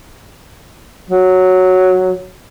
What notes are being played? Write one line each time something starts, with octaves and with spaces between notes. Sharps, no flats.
F#3